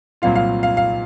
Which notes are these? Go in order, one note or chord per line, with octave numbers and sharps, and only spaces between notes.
C2 A#2 F#3 C4 F4 F5
F5
F5
F5